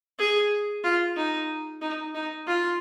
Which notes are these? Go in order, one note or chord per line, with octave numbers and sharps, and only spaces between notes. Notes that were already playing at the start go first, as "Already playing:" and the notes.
G#4
F4
D#4
D#4
D#4
F4